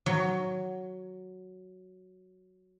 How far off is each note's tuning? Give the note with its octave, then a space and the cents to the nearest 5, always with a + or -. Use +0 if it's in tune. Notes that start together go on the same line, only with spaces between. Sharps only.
F#3 +0 C#5 +25